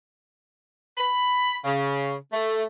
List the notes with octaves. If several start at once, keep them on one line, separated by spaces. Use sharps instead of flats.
B5
C#3
A3